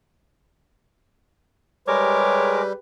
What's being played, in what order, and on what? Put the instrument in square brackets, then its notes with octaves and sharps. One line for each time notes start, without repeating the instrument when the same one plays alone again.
[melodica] G3 [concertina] G#3 A#4 D6 [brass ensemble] G4 G#4 B4 [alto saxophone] C#5